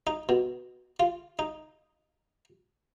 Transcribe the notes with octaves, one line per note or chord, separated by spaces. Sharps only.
D#4
B2
F4
D#4